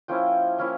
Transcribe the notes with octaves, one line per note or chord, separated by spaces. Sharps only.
F3 A#3 C#4 E4 G5
F3 A#3 C#4 E4